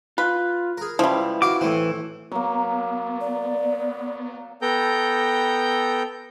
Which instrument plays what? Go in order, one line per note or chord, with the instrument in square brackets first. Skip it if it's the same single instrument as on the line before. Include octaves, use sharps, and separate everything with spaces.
[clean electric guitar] F4 [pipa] B4
[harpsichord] G#4 A#4
[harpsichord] C#2 [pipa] F3 G3 [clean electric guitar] E4 B4
[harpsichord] F#4 F5 [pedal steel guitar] D6
[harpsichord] A2 C4 [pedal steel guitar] E3
[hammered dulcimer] F#3 A#3 [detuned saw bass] B3
[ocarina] D5
[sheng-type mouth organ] B3 A4 G5 A#5 G6